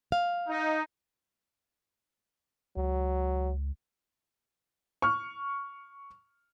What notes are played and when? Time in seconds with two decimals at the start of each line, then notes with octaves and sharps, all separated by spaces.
0.12 F5
0.48 D#4
2.77 C#2 F#3
5.02 C#6 F6